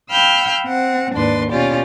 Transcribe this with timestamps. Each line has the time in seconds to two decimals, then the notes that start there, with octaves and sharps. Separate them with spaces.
0.11 F5 G5 B5 E6 F6 G6
0.67 C4 F#5
1.14 D#2 G#2 D4 B4 D5 C6
1.50 B2 C#4 F4 G4 D5